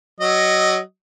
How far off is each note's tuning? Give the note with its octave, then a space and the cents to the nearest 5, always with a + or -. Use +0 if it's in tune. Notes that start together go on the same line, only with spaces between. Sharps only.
F#3 +20 D#5 +0